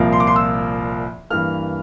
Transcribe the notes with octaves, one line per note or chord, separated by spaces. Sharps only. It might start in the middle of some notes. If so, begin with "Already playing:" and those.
Already playing: C2 A#2 F3 A#3
C6
D6
C6
E6
G2 E3 A#3 F6